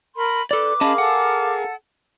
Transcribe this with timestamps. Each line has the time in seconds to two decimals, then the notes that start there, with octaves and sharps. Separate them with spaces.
0.16 A#4 B5 C6
0.51 A4 B4 D5 D6
0.81 C#4 G#4 A#4 D#5 F5 A5 B5
0.98 A4 F#5